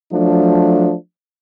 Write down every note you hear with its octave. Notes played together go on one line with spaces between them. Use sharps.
F3 F#3 A3 D4